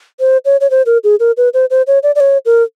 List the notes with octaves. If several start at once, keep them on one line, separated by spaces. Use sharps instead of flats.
C5
C#5
C#5
C5
A#4
G#4
A#4
B4
C5
C5
C#5
D5
D5
C#5
A#4